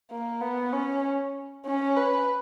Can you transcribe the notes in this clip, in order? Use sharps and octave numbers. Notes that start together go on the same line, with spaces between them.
A#3
B3
C#4
C#4
B4